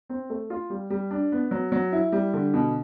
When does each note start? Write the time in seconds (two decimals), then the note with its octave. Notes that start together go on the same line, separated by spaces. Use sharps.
0.09 C4
0.30 A3
0.50 F4
0.70 G3
0.90 G3
1.11 D4
1.32 B3
1.51 F#3
1.72 F#3
1.92 E4
2.12 G3
2.33 D3
2.54 B2